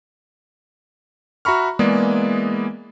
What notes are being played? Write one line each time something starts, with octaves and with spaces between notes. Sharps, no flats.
F#4 E5 A#5 B5 C#6 F6
E3 G#3 A#3 B3 G#4 D5